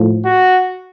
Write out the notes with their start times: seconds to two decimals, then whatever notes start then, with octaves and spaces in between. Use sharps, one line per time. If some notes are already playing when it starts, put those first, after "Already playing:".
Already playing: A2 F3
0.25 F#4